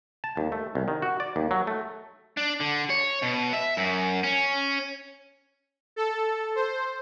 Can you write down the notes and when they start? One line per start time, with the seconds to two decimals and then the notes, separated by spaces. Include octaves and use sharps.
0.24 A5
0.37 D#2
0.52 A3
0.75 C2
0.88 D#3
1.02 F#4
1.20 D5
1.36 D#2
1.51 F#3
1.67 A3
2.37 D4
2.60 D3
2.90 C#5
3.22 B2
3.53 E5
3.77 F#2
4.24 C#4
5.96 A4
6.55 C5